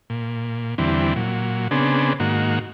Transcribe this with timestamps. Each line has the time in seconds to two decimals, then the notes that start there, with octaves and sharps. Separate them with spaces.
0.10 A#2
0.78 E2 D3 E3 G3 C4
1.16 A#2 F#3
1.71 C#3 B3 C4 D4 G#4
2.20 G#2 D#3 A#3 F#4